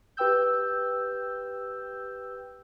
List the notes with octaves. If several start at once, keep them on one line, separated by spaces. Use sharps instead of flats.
G4 B4 G5 E6 G6